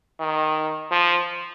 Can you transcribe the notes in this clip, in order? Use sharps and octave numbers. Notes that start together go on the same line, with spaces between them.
D#3
F3